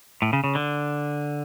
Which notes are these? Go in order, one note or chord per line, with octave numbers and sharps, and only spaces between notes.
A2
C#3
C#3
D3